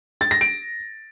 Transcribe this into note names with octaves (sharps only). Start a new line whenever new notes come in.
A6
A#6
D7